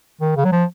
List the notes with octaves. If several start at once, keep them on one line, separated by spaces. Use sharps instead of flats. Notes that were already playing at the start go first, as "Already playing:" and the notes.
D#3
C#3
F#3
F3